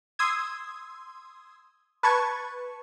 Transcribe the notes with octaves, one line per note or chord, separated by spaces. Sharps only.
C6 D#6 E6 G#6
B4 A5 C#6 G#6